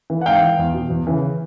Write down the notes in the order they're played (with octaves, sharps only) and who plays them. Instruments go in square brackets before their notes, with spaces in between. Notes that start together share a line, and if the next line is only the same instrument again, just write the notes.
[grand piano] E3
F#5
G#2 F5 G5
E3
E2
B2
E2
C#3 E3